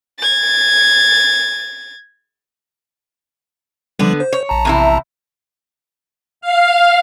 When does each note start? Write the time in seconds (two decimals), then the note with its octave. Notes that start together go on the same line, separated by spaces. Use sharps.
0.19 G#6 A6
3.99 D3 F3 G3 B3
4.20 C5
4.33 C#5
4.49 A#1 A5 A#5
4.65 E2 C3 E4
6.41 F5